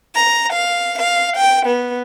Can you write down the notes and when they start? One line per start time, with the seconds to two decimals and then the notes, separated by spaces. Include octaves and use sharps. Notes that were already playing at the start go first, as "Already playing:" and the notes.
0.16 A#5
0.54 F5
0.98 F5
1.37 G5
1.66 B3